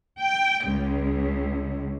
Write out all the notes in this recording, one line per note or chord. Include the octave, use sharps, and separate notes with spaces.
G5
C#2